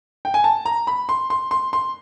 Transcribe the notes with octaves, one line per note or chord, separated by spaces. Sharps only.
G5
G#5
A5
A#5
B5
C6
C6
C6
C6